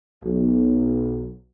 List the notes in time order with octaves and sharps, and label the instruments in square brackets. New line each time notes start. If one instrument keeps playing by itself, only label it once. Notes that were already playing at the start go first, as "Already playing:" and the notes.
[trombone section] B1